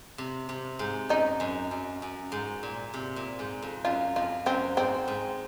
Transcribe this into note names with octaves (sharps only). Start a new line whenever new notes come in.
C3
C3
G#2
F#2 D#4
F#2
F#2
F#2
G#2
A#2
C3
A#2
G#2
F2
F#2 F4
F2 F4
F#2 C4
G#2 C4
G#2